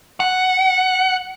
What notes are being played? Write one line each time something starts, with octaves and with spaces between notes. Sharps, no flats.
F#5